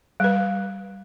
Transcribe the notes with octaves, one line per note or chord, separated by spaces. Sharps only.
G3 B4